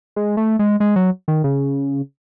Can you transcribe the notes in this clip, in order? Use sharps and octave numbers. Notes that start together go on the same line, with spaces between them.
G#3
A3
G#3
G#3
F#3
D#3
C#3